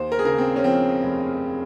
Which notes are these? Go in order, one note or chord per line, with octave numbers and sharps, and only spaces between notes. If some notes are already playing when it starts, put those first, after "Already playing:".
Already playing: D#2 C5
A#4
G#4
C#3 A#4
C4
C#4
F3 C4
F1